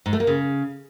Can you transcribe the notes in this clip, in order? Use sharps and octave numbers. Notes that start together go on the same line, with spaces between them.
G#2
A3
A#3
C#3